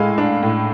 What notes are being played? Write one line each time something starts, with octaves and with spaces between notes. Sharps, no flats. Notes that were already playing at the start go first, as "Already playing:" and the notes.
Already playing: A2 G#3 F5
D4
A2